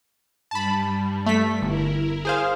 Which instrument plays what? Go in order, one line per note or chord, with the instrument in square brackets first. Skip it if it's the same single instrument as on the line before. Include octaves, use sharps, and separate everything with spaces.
[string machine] G2 G3 [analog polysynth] A5 B5
[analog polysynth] A3 B6
[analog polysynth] G1 [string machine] E4 A#4
[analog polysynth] G#4 C5 F5